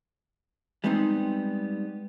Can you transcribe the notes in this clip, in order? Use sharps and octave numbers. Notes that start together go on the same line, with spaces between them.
G3 G#3 B3 C4 D4 D#4